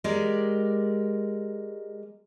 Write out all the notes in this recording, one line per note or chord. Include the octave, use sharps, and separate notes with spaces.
G#3 G4 A#4 D5